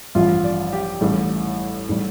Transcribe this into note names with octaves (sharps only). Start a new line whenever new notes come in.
A1 G2 F3 F4
D5
G4
A1 A2 G3
A2 G3